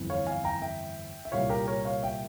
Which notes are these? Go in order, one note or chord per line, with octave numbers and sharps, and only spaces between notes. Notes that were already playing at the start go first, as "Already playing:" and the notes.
Already playing: G1 F2 E3
C#5 F5
F5 G#5
G5 A#5
E5 G5
E5
C2 A#2 G3 C#5 F5
G4 A#4
A#4 C#5
C#5 F5
E5 G5